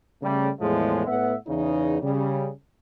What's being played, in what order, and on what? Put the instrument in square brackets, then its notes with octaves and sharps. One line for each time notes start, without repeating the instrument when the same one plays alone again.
[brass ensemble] C#3 G3 A3
E2 A2 F3 G#3
A2 B3 E5 F#5
E2 C#3 D#4
C#3 G3